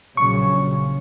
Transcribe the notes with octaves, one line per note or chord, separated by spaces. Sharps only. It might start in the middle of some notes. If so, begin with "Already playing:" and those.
A#1 C#3 F#3 C#6